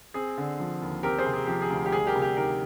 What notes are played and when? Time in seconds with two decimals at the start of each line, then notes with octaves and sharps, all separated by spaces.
0.14 C4 G#4
0.38 D3
0.60 F3
0.82 D#2
1.03 C4 G4 A#4
1.19 G#4 C5
1.26 C3
1.34 G#4
1.47 F3 G4
1.62 G#4
1.70 D2
1.86 G4
1.92 G3 G#4
2.07 G4 A#4
2.15 C3
2.22 G4
2.36 D#3 G4 A#4